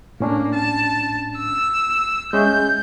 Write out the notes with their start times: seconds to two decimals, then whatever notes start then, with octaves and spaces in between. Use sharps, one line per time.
0.20 A2 A#3 C#4 D4
0.55 A5
1.37 E6
2.33 G#3 C#4 E5 G6